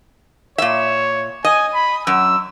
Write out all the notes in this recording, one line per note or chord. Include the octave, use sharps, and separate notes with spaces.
A#2 C#5 E5
D#5 G#5
B5
F#2 E6